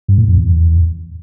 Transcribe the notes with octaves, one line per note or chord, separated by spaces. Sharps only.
G2
A2
F2
E2